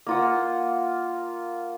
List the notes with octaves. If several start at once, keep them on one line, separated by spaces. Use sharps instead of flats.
A#3 F4 F#5